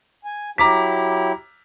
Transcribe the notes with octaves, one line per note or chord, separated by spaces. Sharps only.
G#5
F#3 E4 G4 A#5 D6 B6